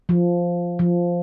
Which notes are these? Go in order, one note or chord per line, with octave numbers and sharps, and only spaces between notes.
F3
F3